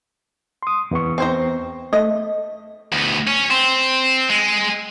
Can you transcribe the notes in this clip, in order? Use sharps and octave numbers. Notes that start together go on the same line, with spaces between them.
C6 D#6
E2 B3 C#6
C4 C5 A#5
A3 D#5
D2 B3
C#4
C4
G#3